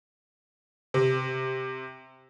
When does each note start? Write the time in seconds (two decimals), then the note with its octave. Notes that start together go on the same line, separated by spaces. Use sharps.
0.94 C3